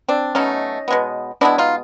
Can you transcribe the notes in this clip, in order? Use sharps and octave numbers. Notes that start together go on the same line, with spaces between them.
C4 D4
B2 F#3 A3 C#4 D#4
B2 G#3 B3
B2 G#3 B3 D4 E4
D#4 F4